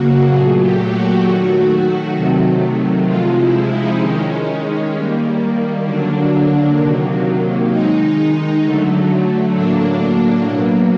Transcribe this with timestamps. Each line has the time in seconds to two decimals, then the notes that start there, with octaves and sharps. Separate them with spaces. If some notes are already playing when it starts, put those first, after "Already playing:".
Already playing: C#3 F#3 A#3 F#4
0.29 A#2 F#3 A3 G#4
0.60 G4
0.91 F#4
1.22 D#3 F#3 A3
2.15 C3 D#3 F#3 A3
3.07 C3 F3 G#3 F4
3.39 E4
3.70 D#4
4.00 D#3 G#3 C#4
4.92 D#3 G3 A#3
5.85 D3 F#3 A#3 D4
6.77 C3 D#3 F#3 A#3
7.71 D#3 G#3 D#4
8.63 D3 F#3 A3
9.56 A2 F#3 A#3 D4
10.49 B2 F#3 A#3